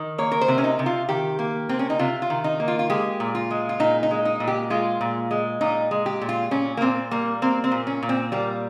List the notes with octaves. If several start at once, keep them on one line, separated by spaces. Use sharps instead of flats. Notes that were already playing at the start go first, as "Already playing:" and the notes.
Already playing: D#3
A#3 C#5
A#4
C5
C3
C#4
D#4
C3
F4
D#3 G4
A#3
C3 C4
C#4
D#4
C3 F4
F4
D#3
D#4
A#3
F4
F4
G#3 G4
A#2
F4
G#3
F4
A#2 D#4
D#4
G#3
D#4
A#2
G4
G#3 F4
A#2
G#3
A#2 D#4
G#3
G4
A#2
F4
A#2 C#4
A#3
A#2 C4
G3 A#3
A#3 C4
C4
A#2
C#4
A#2
C4
G3 A#3